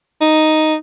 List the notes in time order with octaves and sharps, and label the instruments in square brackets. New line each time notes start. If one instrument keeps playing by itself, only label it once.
[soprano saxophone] D#4